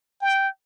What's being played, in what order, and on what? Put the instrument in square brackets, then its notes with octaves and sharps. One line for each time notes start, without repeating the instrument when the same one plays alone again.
[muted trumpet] G5